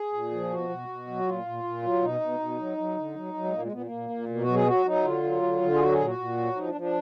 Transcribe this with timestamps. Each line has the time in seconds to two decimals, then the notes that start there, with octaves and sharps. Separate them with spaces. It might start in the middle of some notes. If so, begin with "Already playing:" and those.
Already playing: G#4
0.13 A#2
0.31 F3
0.50 B2 F#4
0.69 B2
0.88 B2
1.07 F#3
1.26 A#2 F4
1.45 A#2
1.63 A#2
1.83 F#3
2.02 B2 D#4
2.21 B2
2.40 B2
2.59 F#3
2.77 F#3
2.97 D3
3.15 F#3
3.34 F#3
3.44 G#3
3.53 A#2 A#3
3.62 G#3
3.72 A#2 B3
3.82 A#3
3.91 A#2
4.10 A#2
4.29 B2 A#3
4.42 F#4
4.48 F#3
4.54 G#4
4.67 F#3 F#4
4.86 F#3 D#4
5.04 D3 F4
5.23 F#3
5.42 D3
5.61 D3
5.75 G#4
5.80 F#3 F#4
5.93 G#4
5.99 A#2
6.06 F#4
6.18 A#2
6.37 F#3
6.56 F3 D#4
6.68 D4
6.75 F3
6.81 D4